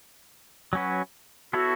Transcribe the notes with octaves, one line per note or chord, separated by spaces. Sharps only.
F#3 C#4 F#4 B4
B3 E4 F#4 A4 C#5